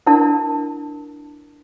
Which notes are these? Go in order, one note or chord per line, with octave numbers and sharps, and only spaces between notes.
D4 E4 A#4 A5